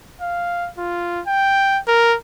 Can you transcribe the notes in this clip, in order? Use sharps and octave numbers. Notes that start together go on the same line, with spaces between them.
F5
F4
G5
A#4